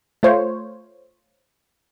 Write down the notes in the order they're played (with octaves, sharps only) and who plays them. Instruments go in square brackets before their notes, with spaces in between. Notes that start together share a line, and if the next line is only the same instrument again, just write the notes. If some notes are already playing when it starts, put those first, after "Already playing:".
[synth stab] A3 F4 C5 C#5